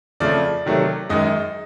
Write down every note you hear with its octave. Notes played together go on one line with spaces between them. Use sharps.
F2 C#3 F3 A3 D5
C3 D#3 F#3 A3
F#2 D#3 G#3 D#5